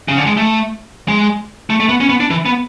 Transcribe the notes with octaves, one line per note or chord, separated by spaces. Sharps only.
C#3
D3
G#3
A3
G#3
A3
A3
B3
C#4
B3
D4
E3
B3